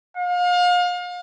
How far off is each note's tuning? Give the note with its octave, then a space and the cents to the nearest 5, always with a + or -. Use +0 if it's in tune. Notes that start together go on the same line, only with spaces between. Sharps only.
F5 +35